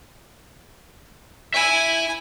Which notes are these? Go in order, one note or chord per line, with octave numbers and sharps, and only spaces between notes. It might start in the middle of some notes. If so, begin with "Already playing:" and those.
E4 E5 G#5